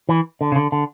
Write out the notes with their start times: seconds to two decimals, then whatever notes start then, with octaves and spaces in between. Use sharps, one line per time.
0.09 E3
0.41 D3
0.52 C#3
0.56 D3
0.72 D3